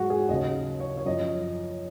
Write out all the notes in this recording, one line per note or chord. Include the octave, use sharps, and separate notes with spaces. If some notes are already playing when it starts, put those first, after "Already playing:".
Already playing: G#2 F#3 F#4 G#4
G#4
D#2 C#3 F#3 D#5
C#5
C#5
F#2 F3 D#5